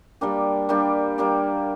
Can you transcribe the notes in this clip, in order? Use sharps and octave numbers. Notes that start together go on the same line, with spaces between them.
G3 A#3 D4 G4
G3 A#3 D4 G4
G3 A#3 D4 G4